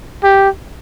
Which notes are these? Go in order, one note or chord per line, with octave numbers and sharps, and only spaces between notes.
G4